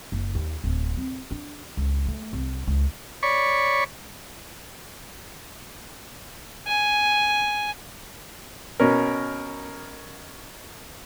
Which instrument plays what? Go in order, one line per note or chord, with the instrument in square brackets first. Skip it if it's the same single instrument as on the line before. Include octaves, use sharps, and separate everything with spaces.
[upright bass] F#1
D#2
D1
C4
D4
C#2
A3
C2
C#2
[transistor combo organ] C#5 D5 B5 C#6
[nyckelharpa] G#5
[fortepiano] B2 C#4 A#4